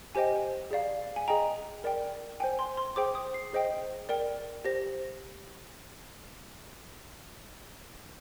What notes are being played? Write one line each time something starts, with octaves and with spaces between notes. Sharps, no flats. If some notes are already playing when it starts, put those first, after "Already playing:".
G4 C5 D#5 G5 G#5
G#4 D5 F5
G#5
G#4 D#5 G5 A#5
A#4 D5 G5
C5 G5 G#5
C6
C6
G#4 C5 G5 D6
D#6
C7
G#4 C5 D#5 G5
A#4 D5 G5
G4 C5 A#6